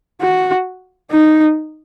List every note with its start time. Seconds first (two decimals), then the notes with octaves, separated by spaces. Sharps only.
0.21 F#4
1.11 D#4